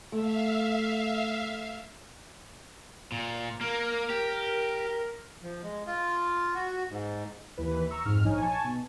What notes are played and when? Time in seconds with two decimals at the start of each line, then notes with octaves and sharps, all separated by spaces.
0.12 A3 E5 F5
3.12 A#2
3.61 A#3 A#4
4.10 G4
5.43 F3
5.63 G#3
5.87 F4
6.54 F#4
6.90 G#2
7.58 D#2 E3 B4
7.91 A#5 C#6 E6
8.05 F2 G#2 F6
8.24 A#1 F3 D#4 C#5 G#5
8.41 G#5 A5 C#6
8.64 B2